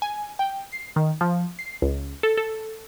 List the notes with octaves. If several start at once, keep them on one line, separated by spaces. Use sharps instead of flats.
G#5
G5
C7
D#3
F3
C7
C#2
A4
A4